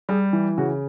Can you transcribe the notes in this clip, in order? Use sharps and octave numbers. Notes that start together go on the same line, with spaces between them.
G3 G#4
E3
C#3 F#4